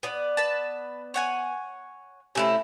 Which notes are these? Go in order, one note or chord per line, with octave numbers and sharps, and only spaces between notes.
B3 D5
B4 A5
C#5 F#5 G#5
C3 A3 C#4 E4